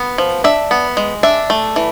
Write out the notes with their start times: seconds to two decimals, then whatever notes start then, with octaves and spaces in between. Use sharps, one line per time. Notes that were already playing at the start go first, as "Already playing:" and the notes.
Already playing: B3
0.18 F3
0.44 D4 E5
0.71 B3
0.97 G#3
1.23 D4 E5
1.50 A3
1.76 E3